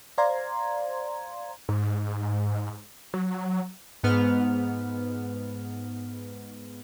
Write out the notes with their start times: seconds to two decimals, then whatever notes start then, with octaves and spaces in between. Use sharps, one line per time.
0.18 C5 D5 F5 A#5 C6 G#6
1.69 G#2
3.14 F#3
4.04 G#2 B3 F6